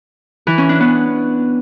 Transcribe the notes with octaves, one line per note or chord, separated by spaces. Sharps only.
E3
C#4
D4
B3